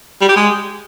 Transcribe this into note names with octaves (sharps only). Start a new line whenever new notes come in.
G3
G4
G#3